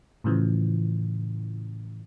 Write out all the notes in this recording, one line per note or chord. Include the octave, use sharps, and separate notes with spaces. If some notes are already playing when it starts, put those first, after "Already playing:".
A2 C#3 E3 F3